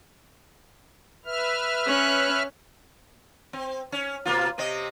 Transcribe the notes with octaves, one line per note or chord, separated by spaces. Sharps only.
B4 E5 F6
C#4 C#5 F#6
C4
C#4
B2 A#3 F4
C3 C4 D#5